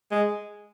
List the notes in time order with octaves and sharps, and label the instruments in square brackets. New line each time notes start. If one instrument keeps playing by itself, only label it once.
[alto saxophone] G#3